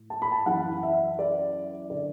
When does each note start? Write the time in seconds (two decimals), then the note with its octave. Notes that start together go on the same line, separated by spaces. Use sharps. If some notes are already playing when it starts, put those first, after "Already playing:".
Already playing: A2
0.10 A5
0.22 B5
0.32 A5
0.46 F#2 E3 F#5
0.83 E5
1.19 D5
1.90 D3 D5